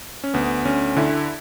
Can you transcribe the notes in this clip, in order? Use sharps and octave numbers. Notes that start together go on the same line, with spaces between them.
C#4
D2 B3
D2 C#4
D3 E4